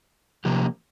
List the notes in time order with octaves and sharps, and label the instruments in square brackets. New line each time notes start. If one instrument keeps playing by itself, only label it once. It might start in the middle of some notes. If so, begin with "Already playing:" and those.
[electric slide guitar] C3 F3 A#3 G4